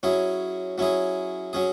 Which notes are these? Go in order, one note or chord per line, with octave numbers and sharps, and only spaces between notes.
F#3 C#4 E4 G#4
F#3 C#4 E4 G#4
F#3 C#4 G#4